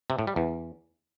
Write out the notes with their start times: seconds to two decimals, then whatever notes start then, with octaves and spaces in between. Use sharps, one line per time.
0.10 C3
0.19 A2
0.27 G3
0.36 E2